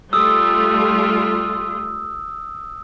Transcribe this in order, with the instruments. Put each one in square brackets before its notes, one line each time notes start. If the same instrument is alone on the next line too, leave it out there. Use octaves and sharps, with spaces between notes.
[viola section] G3 A3 F4 [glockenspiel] D#6 E6